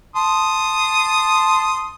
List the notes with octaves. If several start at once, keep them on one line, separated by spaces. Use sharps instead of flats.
A5 C6 D#6